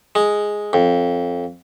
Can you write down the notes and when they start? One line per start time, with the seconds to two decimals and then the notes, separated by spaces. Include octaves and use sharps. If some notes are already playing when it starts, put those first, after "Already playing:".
0.15 G#3
0.73 F2